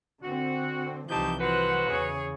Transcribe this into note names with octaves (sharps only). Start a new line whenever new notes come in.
D3 C4 F#4
C2 E3 F3 C4 D#4 G4 A5 G6
F#3 F#4 B4 C5 F#5
E2 C#3 G#4 C#5